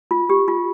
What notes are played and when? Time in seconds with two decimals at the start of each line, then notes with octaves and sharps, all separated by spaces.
0.11 F4
0.30 G4
0.48 F4